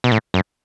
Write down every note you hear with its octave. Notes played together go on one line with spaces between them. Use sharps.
B2
A2
F#2